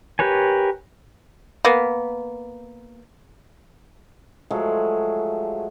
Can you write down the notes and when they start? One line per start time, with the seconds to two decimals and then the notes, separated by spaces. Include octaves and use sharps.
0.19 G4 A#4 B4 C#5 G#5
1.65 A#3 B3
4.50 F3 F#3 G#3 A3